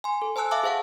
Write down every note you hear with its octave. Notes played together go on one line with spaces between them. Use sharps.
G#5 C6
A4
C5 G#5 A5 E6 F#6
E5 F5 A5 D6 E6
G#4 C5 F5 F#5 A5